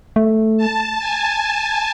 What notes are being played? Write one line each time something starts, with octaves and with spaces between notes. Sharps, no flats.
A3
A5
G#5